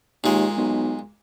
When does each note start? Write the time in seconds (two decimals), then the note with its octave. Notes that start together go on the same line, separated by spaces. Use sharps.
0.24 D#2 A#2 G#3
0.57 B1